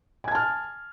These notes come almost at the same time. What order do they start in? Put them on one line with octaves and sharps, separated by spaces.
G#5 G#6 A5 F6